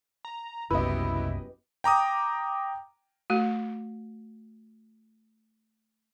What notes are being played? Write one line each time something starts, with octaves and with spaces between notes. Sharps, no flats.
A#5
F#1 C2 F#2 B3 E4 G4 B4 D#5
G5 A#5 D6 D#6
A3 F#4